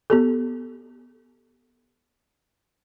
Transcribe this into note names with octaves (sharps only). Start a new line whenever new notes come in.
B3 G4 A4